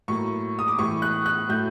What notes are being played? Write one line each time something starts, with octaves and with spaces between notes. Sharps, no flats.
A2 F#3 A#3 C#6
D#6
D6
A2 E3 G3 C#6
F#6
F#6
A2 F#3 A3 G6